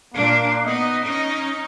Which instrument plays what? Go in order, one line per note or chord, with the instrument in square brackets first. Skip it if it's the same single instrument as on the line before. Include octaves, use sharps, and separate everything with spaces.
[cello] A#2 D4 [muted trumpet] A#3
[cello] B3 D#4 [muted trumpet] D#5
[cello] C#4 D#4